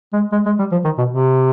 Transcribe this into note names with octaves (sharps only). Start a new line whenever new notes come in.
G#3
G#3
G#3
G3
F3
D#3
B2
C3